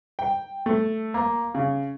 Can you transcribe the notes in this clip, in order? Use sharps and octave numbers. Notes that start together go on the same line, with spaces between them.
G5
A3
A#3
C#3